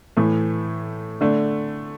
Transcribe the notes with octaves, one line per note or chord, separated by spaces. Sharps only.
A2 E3 A3
D3 A3 D4